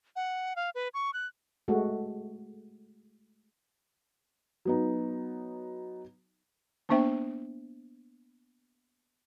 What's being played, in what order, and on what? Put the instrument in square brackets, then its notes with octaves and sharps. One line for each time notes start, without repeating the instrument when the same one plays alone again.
[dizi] F#5
F5
B4
C#6
F#6
[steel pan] G#3 A3 F#4
[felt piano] F#3 B3 D#4
[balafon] A#3 B3 D4 C5 E5 G5